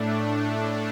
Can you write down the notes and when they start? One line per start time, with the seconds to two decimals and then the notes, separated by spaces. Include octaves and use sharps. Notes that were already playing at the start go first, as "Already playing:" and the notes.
Already playing: A2 A3 D4